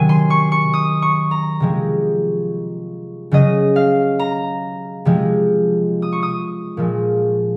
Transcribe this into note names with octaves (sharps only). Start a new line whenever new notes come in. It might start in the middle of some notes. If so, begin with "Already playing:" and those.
Already playing: C3 D#3 F#3 G#5
C6
C#6
C#6
D#6
C#6
A#5
C3 F3 G#3
C#3 F#3 D#5
F5
A#5
C3 F3 G#3
D#6
C#6
D#6
A#2 F3 G#3